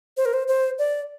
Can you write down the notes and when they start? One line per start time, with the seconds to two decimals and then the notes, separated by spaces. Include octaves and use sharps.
0.17 C5
0.25 A#4
0.33 C5
0.48 C5
0.79 D5